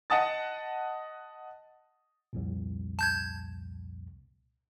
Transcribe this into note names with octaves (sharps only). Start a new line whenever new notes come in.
D#5 F#5 A5 D#6 A6
C2 F2 A#2
A5 G6 G#6